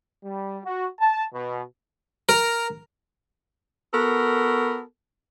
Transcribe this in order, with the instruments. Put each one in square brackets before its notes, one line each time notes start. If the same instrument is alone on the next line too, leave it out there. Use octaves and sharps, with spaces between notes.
[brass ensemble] G3
F#4
A5
B2
[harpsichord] A#4
[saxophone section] B3 F#4 A4 A#4